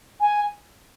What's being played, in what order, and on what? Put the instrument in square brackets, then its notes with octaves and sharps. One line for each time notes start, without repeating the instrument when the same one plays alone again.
[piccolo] G#5